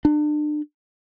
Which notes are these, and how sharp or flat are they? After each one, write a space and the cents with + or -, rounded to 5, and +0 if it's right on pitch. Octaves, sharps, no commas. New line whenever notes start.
D4 +35